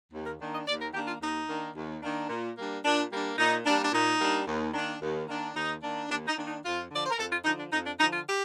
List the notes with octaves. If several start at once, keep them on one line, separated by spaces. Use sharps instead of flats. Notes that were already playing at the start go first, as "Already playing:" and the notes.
D#2
A#4
D#3 A#3 D4
D#5
D#2 D5
A#4
D#3 A#3 D4 G4
F4
D#2 D#4
D#3 A#3 D4
D#2
D#3 A#3 D4
A#2
G3 A#3 D4
A#2 D4
G3 A#3 D4
A#2 D#4
G3 A#3 D4
D4
A#2 D#4
G3 A#3 D4
D#2
D#3 A#3 D4
D#2
D#3 A#3 D4
D#2 D#4
D#3 A#3 D4
D#2 D4
D#4
D#3 A#3 D4
D#4
F2 F4
D3 F3 D5
C5
A#4
F2 A4
F4
D3 F3 D#4
D4
F2 D#4
D4
D3 F3 D#4
F4
G4